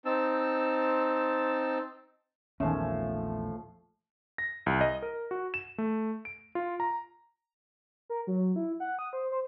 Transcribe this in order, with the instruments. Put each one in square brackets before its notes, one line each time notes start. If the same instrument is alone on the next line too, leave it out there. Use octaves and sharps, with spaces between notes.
[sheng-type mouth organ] C4 D#4 A5 E6
[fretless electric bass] A#1 E2 [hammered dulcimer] A2 F3 [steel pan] D#3 C#4 [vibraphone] E5
[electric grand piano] A#6
C2
D#5
A#4
F#4
E7
A3
D7
F4
A#5
[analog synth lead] A#4
F#3
E4
F#5
D#6
C5
C5